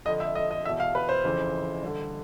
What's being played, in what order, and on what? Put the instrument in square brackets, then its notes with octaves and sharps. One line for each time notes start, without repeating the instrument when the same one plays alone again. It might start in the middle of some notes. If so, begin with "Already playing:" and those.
[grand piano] F2 D3 D#5
E5
D#5
D#5
E2 E5
B2
F5
B4
C5
F2 C#3 E3
G2 D3